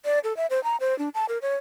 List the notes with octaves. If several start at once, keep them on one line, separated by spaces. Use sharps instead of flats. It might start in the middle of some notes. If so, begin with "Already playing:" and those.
D5
A4
E5
C5
A#5
C5
D4
A5
A#4
C#5